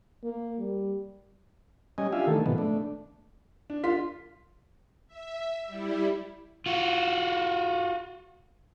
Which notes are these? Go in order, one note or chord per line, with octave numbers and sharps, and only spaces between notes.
A#3
G3
G3 C#4 D#5 G#5
D4 F4 G4 E5 F5 G#5
D#3 E3 A3 A#3 A4
G#2 B2 D#3 F3 B3
A3 D4
D4
F4 B6
E5
G3 E4
F4 F#4